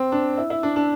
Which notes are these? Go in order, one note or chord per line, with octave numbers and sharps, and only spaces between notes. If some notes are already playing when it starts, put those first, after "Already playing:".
Already playing: C4
D4
E4
E4
D4
D4